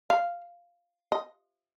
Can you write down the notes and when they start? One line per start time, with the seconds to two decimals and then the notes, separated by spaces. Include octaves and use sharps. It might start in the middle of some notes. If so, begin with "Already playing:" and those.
0.10 F5
1.12 D#5